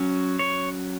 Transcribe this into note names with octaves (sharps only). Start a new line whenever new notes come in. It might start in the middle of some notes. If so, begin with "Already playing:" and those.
Already playing: F#3 C#4
C#5